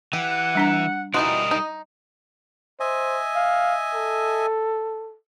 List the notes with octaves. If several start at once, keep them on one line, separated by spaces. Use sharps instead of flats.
E3 G4 F#5
G3 D4 A#5
E3 G3 D#4 F#4 A#4 D#5 C6
D#4
C5 D#5 E5 G#5
F5
A4